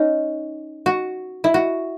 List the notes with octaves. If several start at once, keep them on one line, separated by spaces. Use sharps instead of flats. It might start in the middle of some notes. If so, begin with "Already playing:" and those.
Already playing: C#4 D#4
F#4
E4
F#4